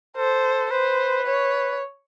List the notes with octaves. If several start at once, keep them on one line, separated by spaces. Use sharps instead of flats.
A4 C5
B4 C5
C#5